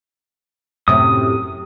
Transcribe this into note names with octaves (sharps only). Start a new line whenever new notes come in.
F#2 A2 C3 D#6